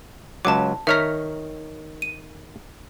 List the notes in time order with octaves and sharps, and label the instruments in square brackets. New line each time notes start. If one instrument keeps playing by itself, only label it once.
[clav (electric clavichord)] C#2 F#3 [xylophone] A5 D6
[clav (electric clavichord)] D#3 C#5 A#5 [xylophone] E5 F6 B6
[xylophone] D#7